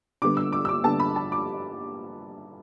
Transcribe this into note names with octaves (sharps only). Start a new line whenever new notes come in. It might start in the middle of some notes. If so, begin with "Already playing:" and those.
D3 G3 B3 D6
E6
D6
E6
D6
D3 G3 B3 A5
B5
A5
D6